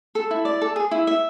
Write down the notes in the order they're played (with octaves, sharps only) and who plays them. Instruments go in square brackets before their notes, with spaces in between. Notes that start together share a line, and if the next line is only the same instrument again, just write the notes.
[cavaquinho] A4
E4
D5
A4
G#4
E4
E5